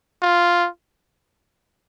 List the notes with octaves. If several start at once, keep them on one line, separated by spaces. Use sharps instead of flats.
F4